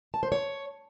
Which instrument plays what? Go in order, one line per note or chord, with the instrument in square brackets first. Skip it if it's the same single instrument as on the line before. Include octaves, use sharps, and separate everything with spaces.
[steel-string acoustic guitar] A5
C5
C#5